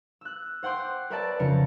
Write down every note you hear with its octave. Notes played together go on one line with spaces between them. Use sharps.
E6 F#6
C5 F#5 G5 C6 D6
A#4 B4 C#5 D5 E5 A5
F2 C#3 A#4 B4 C#7